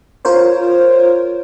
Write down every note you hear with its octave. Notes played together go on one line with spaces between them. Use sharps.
F4 A#4 C5 C#5